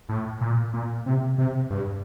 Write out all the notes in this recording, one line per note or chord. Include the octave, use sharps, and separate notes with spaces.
A2
A#2
A#2
C3
C3
G2